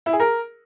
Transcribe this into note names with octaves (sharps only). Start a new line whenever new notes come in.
E4
G#4
A#4